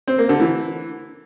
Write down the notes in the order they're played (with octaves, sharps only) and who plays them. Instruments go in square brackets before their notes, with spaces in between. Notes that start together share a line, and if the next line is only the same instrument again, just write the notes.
[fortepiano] C4
A#3
D3
E3